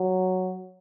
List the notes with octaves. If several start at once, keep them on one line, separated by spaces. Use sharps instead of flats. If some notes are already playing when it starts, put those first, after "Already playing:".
Already playing: F#3